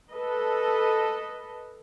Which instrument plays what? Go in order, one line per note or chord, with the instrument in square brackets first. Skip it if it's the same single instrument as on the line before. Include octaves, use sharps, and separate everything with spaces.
[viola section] A4 B4 D#5